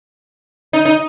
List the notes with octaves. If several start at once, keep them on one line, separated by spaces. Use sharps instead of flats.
D#4
D#4